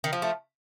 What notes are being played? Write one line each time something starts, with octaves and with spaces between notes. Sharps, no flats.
D#3
F3
A3